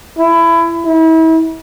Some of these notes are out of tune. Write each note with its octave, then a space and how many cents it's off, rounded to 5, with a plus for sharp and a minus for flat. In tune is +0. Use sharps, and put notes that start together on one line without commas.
E4 +20
E4 -35